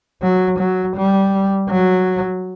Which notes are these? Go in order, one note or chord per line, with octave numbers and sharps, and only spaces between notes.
F#3
F#3
G3
F#3